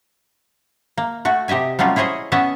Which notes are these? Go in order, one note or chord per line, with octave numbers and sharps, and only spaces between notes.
A#3
A3 F#4
C3 G4 D#5 E5 G#5
F#3 G3 A3 C#4 F4
E4 G#4 C5 C#5 D#5
B3 C#4 C#5 D#5 E5 A5